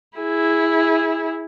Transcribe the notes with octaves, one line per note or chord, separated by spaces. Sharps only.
E4 G#4